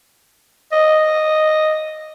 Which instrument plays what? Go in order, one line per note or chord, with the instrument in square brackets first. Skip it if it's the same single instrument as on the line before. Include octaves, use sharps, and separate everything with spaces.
[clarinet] D#5